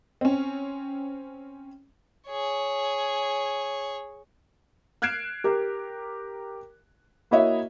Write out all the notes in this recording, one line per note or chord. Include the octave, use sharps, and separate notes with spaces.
C4 C#4
G#4 C#5
F6 F#6 G#6 C7 D7 E7
G4 A#4
A#3 E4 F#4 C#5 D#5 E5